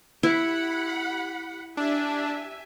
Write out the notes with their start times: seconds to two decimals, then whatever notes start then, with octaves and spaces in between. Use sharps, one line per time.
0.23 E4 G4 F#5 B5
1.77 D4 G4 E5 G#5